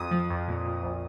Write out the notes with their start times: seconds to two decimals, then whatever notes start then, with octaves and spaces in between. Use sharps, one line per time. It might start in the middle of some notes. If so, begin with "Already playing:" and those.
Already playing: F2 D#6
0.11 F3
0.30 F2
0.48 A#2
0.66 A#2
0.83 A#1